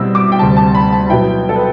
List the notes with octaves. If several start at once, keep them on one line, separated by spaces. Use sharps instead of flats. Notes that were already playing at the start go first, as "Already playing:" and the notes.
Already playing: B2 G3 C4 E4 E6
D6
G5
D2 C3 G3 A5
A5
B5
A5
B2 F#3 B3 E4 G5
A4
B4